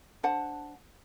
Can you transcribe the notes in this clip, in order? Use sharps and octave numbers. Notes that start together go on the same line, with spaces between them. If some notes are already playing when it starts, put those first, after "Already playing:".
D4 C5 F#5 A5